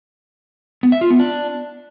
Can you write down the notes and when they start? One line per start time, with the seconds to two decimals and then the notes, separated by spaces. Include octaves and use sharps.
0.83 B3
0.92 E5
1.01 F4
1.10 B3
1.20 D4